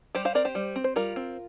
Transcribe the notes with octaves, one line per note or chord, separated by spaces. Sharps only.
G3 G4 C5
C5 F5
C4 A#4 D5
G4 C5
G3
C4
C5
G3 F4 A#4
C4